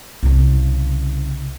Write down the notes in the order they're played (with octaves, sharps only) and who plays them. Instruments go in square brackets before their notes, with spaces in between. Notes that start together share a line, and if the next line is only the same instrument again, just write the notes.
[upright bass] C2 C#3